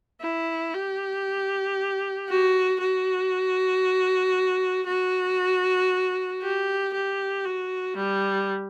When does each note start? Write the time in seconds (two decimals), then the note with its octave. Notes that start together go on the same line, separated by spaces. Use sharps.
0.21 E4
0.74 G4
2.28 F#4
2.80 F#4
4.87 F#4
6.42 G4
6.94 G4
7.45 F#4
7.97 G3